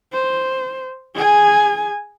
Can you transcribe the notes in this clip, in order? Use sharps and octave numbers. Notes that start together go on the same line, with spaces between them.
C5
G#4 G#5